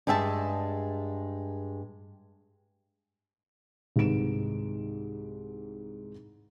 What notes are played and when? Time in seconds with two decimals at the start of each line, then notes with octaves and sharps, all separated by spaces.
0.07 G2 G#3 G#4 E5 G5 A5
3.96 C2 G#2 D#3 B4 D7 E7